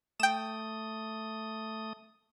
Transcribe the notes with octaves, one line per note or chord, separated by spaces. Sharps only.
A3 G5 D#6 E7